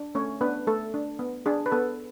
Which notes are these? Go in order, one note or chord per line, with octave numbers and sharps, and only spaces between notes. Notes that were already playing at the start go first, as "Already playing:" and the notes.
Already playing: D4
A3 C#4 C#5
B3 D4 B4
A3 A4
D4
B3
D4 G#4
B4
B3 A4